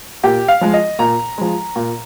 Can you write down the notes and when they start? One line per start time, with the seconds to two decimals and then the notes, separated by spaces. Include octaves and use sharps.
0.23 A#2 G4
0.48 F5
0.61 F3 G#3
0.74 D#5
0.99 A#2 A#5
1.38 F3 G#3
1.76 A#2